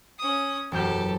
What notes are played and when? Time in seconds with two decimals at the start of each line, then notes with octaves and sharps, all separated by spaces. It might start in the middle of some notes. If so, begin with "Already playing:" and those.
0.18 C#4 D#6
0.72 E1 F#2 G4 A4 G6